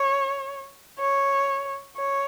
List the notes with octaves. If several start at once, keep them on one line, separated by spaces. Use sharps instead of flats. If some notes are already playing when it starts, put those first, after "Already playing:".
Already playing: C#5
C#5
C#5